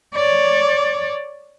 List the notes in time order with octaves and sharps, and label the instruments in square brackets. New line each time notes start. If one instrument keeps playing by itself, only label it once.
[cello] C#5 D5